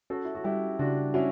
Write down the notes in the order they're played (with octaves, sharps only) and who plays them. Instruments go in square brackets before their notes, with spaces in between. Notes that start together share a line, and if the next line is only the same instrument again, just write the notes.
[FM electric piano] C#4 [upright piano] F#4 A4
[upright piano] E4
F#4
[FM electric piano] G3 [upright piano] E4 G4
[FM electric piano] C#3 [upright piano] D4 F#4
[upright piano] C#4 E4 [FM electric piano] F#4